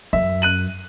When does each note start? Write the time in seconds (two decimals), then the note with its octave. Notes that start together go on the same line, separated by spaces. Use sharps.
0.13 F#2 E5
0.42 F#6 D#7 F#7